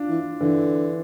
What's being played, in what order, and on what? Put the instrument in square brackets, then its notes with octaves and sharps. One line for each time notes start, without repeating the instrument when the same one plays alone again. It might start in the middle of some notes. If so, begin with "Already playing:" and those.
Already playing: [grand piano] D4 F4
[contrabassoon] E3
[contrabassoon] D3 [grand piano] E3